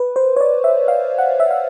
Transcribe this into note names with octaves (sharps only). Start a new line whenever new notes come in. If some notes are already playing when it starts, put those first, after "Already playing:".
Already playing: B4
C5
C#5
D5
E5
F5
F#5
E5
F5